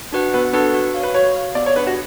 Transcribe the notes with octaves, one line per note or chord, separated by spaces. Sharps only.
D4 F#4 B4 F#5
B3 B4
D4 F#4 A4 B4 F#5
F#4
C#5 F5
B4
F#4 C#5
C#5 F5
B3 D5
C#5
D4 G#4 B4 D5 F#5
F#4